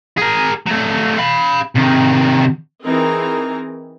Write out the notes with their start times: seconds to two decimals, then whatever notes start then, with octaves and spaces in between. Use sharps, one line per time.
0.18 G#4 A#4
0.66 F#3 A3
1.18 F5 B5
1.75 C3 D#3
2.83 E3 C4 D#4 G#4 A#4 A#5